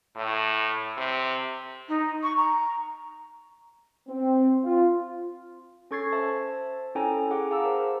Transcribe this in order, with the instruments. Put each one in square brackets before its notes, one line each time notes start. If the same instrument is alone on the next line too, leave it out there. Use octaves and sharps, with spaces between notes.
[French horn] A2
C3
[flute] D#4
C#6
A#5
[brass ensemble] C4
F4
[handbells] C#4 A4 C#6 G#6 A6 C7
C5 E5 A5
C#4 E4 A4 G5 G#5 A#5
G#4 F#5 D6
G#4 F5 A5 A#5 E6
A#4 C5